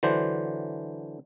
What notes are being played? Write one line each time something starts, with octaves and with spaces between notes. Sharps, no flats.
D3 E3 F#3 D4 C5